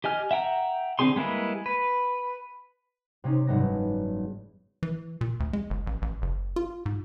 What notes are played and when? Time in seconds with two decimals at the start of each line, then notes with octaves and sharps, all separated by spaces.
0.04 G4 D#5 G#5 F6
0.31 E5 F#5 G5 A#5
0.99 D3 C4 D#4 G#4 C6
1.16 G3 G#3 A#3 E4 B4
1.66 B4
3.24 C3 C4 C#4 D#4
3.47 F#1 G#2 E3 G3 B3 A#6
4.83 E3
5.21 A#2
5.40 D2
5.53 G#3
5.70 G1
5.87 A1
6.02 A1
6.22 F#1
6.56 F4
6.86 G#2